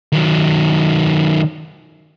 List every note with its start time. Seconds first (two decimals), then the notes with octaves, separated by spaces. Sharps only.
0.12 D#3 F#3